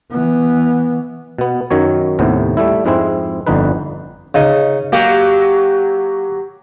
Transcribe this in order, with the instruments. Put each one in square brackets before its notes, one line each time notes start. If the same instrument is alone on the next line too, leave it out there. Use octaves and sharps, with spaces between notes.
[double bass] E3 B3
[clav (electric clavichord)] B2 B3
F#2 D#3 F#3 C#5
D#2 A2 C3 B3
G3 A3 E4
F2 G#2 G#3 C4 E4
G1 F2 D3 D#4 B4
[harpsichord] C#3 D#4
[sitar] F#3 G4 [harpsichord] A#3